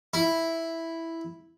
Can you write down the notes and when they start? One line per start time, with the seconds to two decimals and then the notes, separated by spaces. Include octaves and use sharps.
0.14 E4